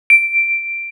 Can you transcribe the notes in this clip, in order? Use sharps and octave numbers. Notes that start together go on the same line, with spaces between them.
D7